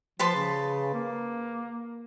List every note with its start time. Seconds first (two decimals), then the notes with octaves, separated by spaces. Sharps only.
0.19 F3 B4 A5 C6
0.35 C#3
0.94 A#3